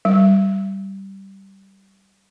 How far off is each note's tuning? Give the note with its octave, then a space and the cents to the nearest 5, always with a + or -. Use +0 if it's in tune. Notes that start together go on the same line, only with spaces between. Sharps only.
G3 -10